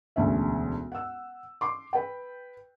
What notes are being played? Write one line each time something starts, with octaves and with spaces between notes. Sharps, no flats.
E1 D2 C#4 E5
F#5 E6
C6 D6
B4 G5